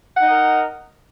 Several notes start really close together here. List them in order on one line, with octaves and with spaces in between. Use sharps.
F#5 D#4 D#5 A#4